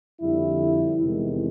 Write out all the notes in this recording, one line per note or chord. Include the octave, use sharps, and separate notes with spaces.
F2 D3 G3 E4
E2 C3 D#3 G#3